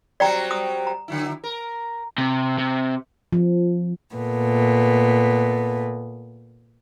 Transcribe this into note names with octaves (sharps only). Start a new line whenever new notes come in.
F#3 G3 C4 D5 G5 A#5
D#6
A#5
D3 F#3 E4
A#4
C3
C3
F3
A#2 A3 B3